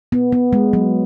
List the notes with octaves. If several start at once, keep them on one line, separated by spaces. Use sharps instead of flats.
B3
B3
G#3
F#3